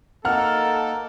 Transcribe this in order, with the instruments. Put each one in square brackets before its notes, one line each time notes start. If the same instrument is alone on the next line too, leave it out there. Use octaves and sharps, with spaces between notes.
[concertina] A#3 D#4 A#4 [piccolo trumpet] A4 [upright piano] F#5 F6